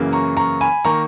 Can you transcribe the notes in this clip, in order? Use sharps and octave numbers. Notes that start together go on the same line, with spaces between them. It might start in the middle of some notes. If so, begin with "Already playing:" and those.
Already playing: F#2 C#3 E3 A#3
A#5 C#6
A#5 C#6
G#5 B5
D#3 A#3 A#5 C#6